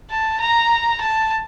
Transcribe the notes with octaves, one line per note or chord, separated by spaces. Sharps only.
A5
A#5
A5